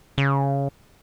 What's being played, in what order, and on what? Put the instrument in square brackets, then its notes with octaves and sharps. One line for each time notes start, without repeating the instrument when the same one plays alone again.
[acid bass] C#3